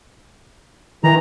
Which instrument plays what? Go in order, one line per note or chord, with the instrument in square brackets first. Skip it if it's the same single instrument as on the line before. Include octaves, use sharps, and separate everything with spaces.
[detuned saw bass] D#3 [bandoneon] E3 A#5